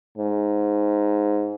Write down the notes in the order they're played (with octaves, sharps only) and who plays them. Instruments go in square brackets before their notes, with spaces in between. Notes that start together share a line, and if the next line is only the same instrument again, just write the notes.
[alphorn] G#2